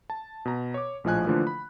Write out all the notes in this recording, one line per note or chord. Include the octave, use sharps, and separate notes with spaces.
A5
B2 A#5
C#5 D6
A#1 A2 F3 D#5 G#5 F#6
D3 E3 F3 A3 A#3
B5